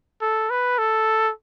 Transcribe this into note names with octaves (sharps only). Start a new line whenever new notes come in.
A4
B4
A4